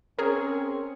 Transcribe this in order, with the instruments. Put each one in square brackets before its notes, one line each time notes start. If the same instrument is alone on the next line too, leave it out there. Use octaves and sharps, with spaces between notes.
[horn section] C4 C#4 [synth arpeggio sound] G#4 A#4